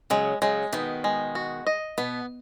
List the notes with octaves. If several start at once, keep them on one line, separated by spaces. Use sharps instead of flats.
C#3 F#3 G#3
C#3 F#3 G#3
B2 D#3 B3
G#3
F#4
D#5
B2 B3